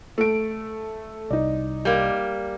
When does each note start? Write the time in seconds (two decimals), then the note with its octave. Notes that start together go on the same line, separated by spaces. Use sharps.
0.18 A3 D7
1.30 C2 D#4 D5
1.85 G3 A#3